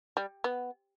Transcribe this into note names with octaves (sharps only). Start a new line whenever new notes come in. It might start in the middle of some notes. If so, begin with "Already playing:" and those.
G3
B3